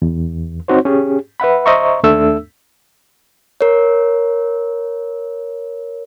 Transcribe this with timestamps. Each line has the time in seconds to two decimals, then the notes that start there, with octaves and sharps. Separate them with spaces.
0.02 E2
0.68 C4 D#4 F#4 C5 C#5
0.85 C#4 G4 G#4
1.40 B4 E5 F#5 B5
1.66 C5 D#5 E5 A#5 C#6
2.03 D#2 A3 D4 A4 E5 E6
3.61 A#4 C#5